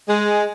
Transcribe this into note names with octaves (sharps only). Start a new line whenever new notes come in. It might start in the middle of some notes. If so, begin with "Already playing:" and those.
G#3